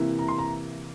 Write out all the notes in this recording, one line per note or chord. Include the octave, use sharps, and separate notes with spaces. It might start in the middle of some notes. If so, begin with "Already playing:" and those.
Already playing: C3 E3 A#3 E4
A#5
C6
A#5